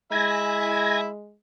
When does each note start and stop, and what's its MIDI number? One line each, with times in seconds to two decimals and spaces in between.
0.12 1.35 56
0.12 1.06 64
0.12 1.06 76
0.12 1.01 80
0.12 1.06 83
0.12 1.01 92
0.12 1.01 94